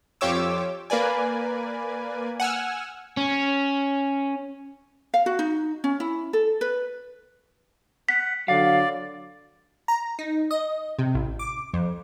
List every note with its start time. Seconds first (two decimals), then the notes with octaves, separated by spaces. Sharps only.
0.21 F2 F4 G4 C#5 D6 E6
0.90 A#3 B4 D5 G#5
2.40 F#5 G#5 E6 F6
3.17 C#4
5.14 F5
5.26 F#4
5.39 D#4
5.84 C#4
6.00 E4
6.33 A4
6.61 B4
8.09 F#5 B6
8.48 D3 F#3 D5 F5
9.88 A#5
10.19 D#4
10.51 D#5
10.99 C3
11.15 A1
11.39 D6
11.73 F2